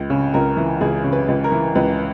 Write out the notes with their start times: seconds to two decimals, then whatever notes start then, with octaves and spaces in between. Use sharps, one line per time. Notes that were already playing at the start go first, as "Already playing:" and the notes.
Already playing: C#2
0.10 C#3
0.34 C#2 A#4
0.57 E3
0.81 C#2 G#4
1.04 C#3
1.12 B4
1.28 C#2
1.44 A#4
1.52 E3
1.75 C#2 B4